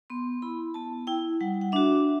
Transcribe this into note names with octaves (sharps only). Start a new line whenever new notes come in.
B3 C6
E4 B5
B3 A5
E4 G5
G3 F#5
F#5
D4 F#4 E5